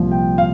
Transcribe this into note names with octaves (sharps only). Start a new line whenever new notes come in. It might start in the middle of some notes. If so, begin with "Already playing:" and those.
Already playing: C2 A#2 F3
G5
F5